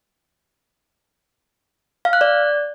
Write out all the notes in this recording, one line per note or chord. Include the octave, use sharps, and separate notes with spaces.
F5
F#6
D5